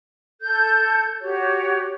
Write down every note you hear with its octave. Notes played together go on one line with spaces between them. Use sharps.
A4 G6
F#4 G4 C#5